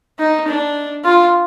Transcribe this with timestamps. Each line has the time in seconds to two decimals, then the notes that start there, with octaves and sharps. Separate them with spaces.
0.19 D#4
0.48 D4
1.04 F4